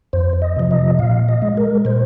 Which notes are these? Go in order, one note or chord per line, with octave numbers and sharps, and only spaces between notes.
F2 C5
D#5
C3 F3
D#5
A#2 F5
D#5
G#3
A#4
A#2 C5